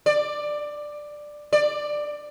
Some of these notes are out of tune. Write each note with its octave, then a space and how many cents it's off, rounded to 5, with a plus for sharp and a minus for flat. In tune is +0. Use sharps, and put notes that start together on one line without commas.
D5 +10
D5 +10